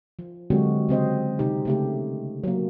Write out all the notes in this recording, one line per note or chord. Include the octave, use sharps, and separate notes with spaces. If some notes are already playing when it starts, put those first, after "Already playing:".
F3
D3 F#3 G#3 C4 F#4 G4
C#3 C4 C5 D#5
C3 D#4 G4
C#3 A3 G4
F#3 A#3